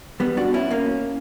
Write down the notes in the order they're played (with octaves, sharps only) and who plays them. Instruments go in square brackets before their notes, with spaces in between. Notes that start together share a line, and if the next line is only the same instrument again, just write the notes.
[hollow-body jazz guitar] G3 B3
D4 F#4
C#4 E4
A#3 C#4